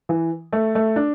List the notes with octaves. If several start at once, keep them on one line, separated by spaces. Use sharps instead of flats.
E3
A3
A3
D4